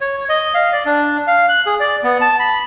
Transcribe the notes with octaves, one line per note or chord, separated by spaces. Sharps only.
C#5
D#5
F5
D5
D4
F5
F#6
G#4
D5
B3
A5
B5